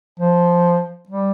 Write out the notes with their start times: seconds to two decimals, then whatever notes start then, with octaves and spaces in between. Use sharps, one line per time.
0.19 F3
1.09 G3